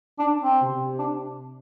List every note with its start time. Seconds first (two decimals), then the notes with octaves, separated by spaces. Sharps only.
0.19 D4
0.41 C4
0.62 C3
0.99 D4